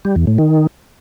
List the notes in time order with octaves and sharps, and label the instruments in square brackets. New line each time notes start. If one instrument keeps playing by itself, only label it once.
[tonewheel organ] G3
E2
A2
D#3